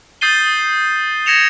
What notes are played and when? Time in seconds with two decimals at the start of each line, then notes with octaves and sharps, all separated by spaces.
0.21 D#6 G6 A6 C7 D#7 G7
1.26 G#6 A#6 C#7 E7 F7